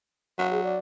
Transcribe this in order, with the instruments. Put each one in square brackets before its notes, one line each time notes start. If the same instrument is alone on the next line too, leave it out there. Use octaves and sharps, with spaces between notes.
[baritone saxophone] F#3
[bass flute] G#4
D5